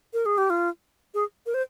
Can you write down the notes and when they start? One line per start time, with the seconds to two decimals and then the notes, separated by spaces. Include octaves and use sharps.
0.13 A#4
0.26 G#4
0.38 G4
0.50 F4
1.14 G#4
1.46 A#4
1.54 C5